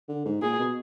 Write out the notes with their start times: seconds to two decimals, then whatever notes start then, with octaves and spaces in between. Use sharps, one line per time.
0.09 D3
0.26 G#2
0.42 A#2 G#4
0.59 B2